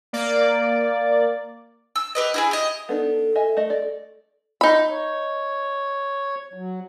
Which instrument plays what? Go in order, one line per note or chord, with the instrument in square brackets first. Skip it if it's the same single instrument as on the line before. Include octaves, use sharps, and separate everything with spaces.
[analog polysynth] A#3 D5
[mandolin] E6
G4 B4 D#5
E4 F#4 G#4
G4 D#5
[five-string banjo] B3 D4 D#4 [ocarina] A4
[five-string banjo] D#5 E5 G#5
A3 D#5
D5
D#4 B5
[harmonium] C#5
F#3